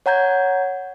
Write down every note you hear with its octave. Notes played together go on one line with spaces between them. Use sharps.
C#5 F#5 A#5 G6 G#6